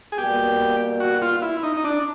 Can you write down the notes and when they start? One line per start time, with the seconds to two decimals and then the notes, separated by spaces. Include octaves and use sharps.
0.12 G#4
0.17 B2 G3 A#3 G4
1.00 F#4
1.22 F4
1.42 E4
1.63 D#4
1.77 D#4
1.84 D4